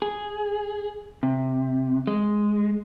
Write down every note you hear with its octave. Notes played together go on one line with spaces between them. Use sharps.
G#4
C3
G#3